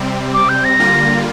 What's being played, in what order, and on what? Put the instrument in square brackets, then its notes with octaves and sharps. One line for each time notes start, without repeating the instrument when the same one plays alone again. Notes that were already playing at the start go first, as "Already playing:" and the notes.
Already playing: [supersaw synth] C3 G3 C4
[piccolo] D6
G6
A#6
[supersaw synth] D3 G3 A#3 F4